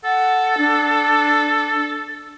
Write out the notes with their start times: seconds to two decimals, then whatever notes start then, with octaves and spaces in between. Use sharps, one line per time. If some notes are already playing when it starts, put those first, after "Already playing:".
0.04 A4 F#5
0.58 D4